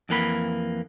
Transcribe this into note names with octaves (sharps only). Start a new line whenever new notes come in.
F2 E3 A#3 B5